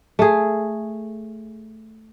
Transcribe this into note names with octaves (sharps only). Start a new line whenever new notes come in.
A3 G#4